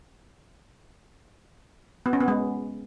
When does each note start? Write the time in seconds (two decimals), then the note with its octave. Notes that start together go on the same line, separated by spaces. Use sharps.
2.06 B3
2.13 C#4
2.20 B3
2.28 G#3